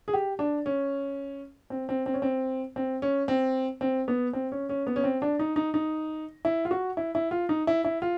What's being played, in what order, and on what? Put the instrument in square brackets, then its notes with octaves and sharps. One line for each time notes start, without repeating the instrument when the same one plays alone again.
[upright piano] G#4
G4
D4
C#4
C4
C4
C4
C#4
C4
C4
C#4
C4
C4
B3
C4
C#4
C#4
B3
C#4
C4
D4
D#4
D#4
D#4
E4
F4
F#4
E4
E4
F4
D#4
E4
E4
F4